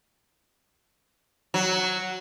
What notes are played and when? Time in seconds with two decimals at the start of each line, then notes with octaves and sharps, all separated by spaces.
1.54 F#3